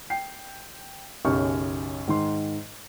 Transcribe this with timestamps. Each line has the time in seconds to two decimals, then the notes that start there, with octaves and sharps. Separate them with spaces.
0.10 G5 C7
1.25 B1 F#2 C#3 G4 C#6 F6
2.07 G#2 D#3 C6